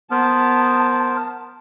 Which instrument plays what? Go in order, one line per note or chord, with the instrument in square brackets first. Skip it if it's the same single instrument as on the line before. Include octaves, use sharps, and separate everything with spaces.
[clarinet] B3 [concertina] A#4 C5 [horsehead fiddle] A5